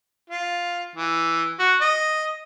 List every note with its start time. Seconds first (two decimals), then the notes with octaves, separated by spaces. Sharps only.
0.30 F4
0.96 E3
1.59 F#4
1.81 D#5